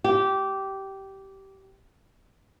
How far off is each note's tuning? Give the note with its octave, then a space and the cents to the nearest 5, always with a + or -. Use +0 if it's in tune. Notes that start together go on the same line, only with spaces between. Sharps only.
G4 -15